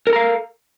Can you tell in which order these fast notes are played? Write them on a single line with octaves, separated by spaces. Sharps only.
A#4 A4 A#5 F5